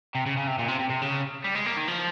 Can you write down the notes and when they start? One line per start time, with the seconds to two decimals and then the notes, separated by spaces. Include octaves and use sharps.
0.15 C3
0.26 C#3
0.37 C#3
0.47 C3
0.59 A#2
0.68 C3
0.79 C3
0.90 C3
1.02 C#3
1.44 G3
1.55 G#3
1.66 A#3
1.77 D#3
1.88 F3